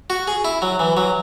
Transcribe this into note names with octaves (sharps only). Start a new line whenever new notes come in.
F#4
G#4
E4
F#3
E3
F#3